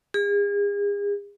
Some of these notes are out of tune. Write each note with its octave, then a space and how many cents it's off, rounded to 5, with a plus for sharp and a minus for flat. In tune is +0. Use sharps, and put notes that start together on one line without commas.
G#4 -40